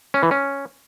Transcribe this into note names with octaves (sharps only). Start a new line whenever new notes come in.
C#4
E3
C#4